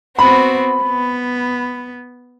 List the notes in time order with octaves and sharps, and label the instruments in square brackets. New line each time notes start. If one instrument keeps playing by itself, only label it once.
[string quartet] B3 C4 F#4 [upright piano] B5
[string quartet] B3